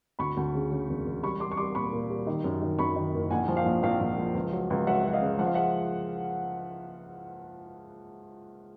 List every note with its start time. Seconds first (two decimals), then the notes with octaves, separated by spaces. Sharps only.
0.19 D2 B5 C#6
0.37 D2
0.54 C#3
0.71 C#3
0.89 E1
1.06 E1
1.23 G3 B5 C#6
1.40 G3 C6 D6
1.52 C#6
1.57 G3 C6 D6
1.75 A#2 B5 C#6
1.93 A#2
2.10 G3
2.27 D#3
2.44 F#2
2.61 D#3
2.79 F#2 B5 C#6
2.96 D#3
3.14 F#1
3.31 A#1 F#5 G#5
3.48 F3
3.57 F5 G5
3.66 A#1
3.83 A#1 F5 G5
4.01 A#1
4.18 F3
4.35 C#2
4.53 F#3
4.70 C#2
4.86 F#3 E5 F#5
5.05 F#3 F#5
5.13 D#5 F5
5.22 C#3
5.39 F3 F#5
5.47 F5
5.54 G#3 E5 F#5